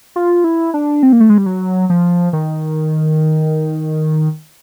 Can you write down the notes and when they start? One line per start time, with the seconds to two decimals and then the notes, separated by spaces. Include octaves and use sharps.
0.16 F4
0.44 E4
0.74 D4
1.03 C4
1.13 A#3
1.20 A3
1.30 G#3
1.38 G3
1.46 F#3
1.90 F3
2.33 D#3